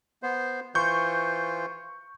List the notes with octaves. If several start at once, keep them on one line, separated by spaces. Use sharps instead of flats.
B3 C5
E3 F4 C5 C#6 G6